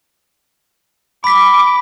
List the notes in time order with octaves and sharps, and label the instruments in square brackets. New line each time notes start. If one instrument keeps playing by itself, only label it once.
[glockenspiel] B5 B6 [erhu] D6